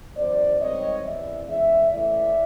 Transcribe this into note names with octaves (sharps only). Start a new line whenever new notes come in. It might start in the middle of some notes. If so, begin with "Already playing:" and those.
E2 C#3 F#3 C5 D5
G#2 D#3 G3 C4 C#5 D#5
E2 C3 E3 D5 E5
E2 C#3 E3 G#3 D5 E5
C#3 E3 A3 C#4 E4 D5 E5